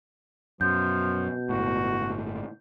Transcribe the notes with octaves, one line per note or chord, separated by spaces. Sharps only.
F#2 B2 F3 G6
G1 A2 F#4